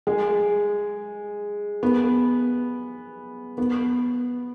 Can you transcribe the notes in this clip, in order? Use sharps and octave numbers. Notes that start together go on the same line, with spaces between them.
G#3
B3
B3